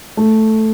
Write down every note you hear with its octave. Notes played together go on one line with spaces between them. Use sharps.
A3